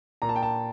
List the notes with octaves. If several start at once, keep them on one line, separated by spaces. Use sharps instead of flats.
A#2 A#5
A5
G5
A5